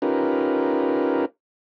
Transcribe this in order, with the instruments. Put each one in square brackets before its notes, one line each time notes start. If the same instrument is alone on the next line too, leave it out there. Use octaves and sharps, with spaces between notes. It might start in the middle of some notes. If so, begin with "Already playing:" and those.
[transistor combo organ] C#4 D#4 F4 G4 A#4 B4